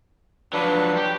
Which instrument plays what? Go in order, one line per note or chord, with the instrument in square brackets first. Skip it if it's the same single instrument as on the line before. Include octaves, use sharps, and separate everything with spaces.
[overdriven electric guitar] F3 F#3 [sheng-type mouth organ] D4 B4
[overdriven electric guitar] G4